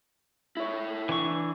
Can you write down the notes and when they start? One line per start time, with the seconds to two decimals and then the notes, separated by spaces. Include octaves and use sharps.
0.57 E4 C#5
1.09 E3 D4 C#6